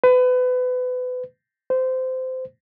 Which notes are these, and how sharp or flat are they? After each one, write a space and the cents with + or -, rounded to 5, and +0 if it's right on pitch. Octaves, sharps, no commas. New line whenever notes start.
B4 +30
C5 -20